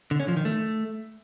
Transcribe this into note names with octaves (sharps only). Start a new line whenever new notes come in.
D3
C#4
F3
D#3
A3